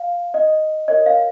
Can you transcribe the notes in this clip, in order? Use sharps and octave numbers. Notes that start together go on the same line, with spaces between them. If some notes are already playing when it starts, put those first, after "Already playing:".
Already playing: F5
D#5
F#4 A#4 C#5 D#5
F5